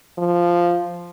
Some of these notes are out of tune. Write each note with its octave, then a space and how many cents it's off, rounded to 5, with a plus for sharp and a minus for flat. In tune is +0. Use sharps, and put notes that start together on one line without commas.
F3 -5